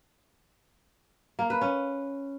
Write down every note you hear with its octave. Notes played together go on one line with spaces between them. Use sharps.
A#3
B4
C#4